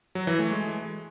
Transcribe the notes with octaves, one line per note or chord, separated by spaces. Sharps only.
F#3
E3
A3
G#3